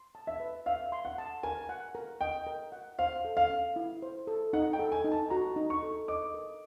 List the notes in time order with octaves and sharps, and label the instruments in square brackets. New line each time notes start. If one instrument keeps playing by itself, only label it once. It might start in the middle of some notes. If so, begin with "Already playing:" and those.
Already playing: [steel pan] C6
A5
[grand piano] E5
[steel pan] B4
[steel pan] E5 [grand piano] F5
[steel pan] C6
[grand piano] F#5
[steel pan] A5
[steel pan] A#4 [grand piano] G#5
[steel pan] F#5
A#4
[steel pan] D#5 [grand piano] G5
[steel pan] A#4
F#5
[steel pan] C5 [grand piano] F5
[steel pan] A4
[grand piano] F5
[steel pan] C#4
E4
C5
A4
[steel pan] D#4 [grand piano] F#5
[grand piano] G5
[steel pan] A4
[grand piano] G#5
[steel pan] D#4
[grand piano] A5
[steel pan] F#4 [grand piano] A#5
[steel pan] D#4
[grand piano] C#6
[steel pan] A4
[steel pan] D#5 [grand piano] D6
[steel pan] A#4